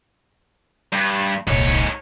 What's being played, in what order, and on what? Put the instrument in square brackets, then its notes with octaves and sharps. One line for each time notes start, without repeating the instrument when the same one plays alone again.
[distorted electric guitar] G2
[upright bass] D#1 C2 [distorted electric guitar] G#2 C#5